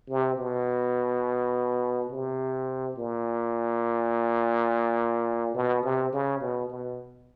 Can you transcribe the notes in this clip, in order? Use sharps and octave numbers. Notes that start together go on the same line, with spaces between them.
C3
B2
C3
A#2
B2
C3
C#3
B2
B2